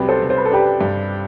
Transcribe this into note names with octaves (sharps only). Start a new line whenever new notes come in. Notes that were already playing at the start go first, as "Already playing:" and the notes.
Already playing: C2 F#3 G4 B4
A4 C5
C2
C5
B4
A4
D4 G4 B4
G2